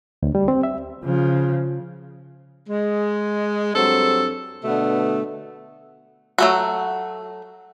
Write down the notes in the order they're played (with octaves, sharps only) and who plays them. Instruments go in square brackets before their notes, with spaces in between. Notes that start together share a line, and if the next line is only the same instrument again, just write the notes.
[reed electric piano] D2
G3
C4
E5
[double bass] C#3 F3
[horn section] G#3
G2 F#3 C4 A4
B2 D3 A3 B3
[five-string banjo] F#3 A3 F#4